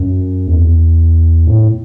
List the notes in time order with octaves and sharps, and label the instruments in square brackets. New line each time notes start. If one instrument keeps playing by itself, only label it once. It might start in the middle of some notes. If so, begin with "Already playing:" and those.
Already playing: [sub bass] F#2
E2
A2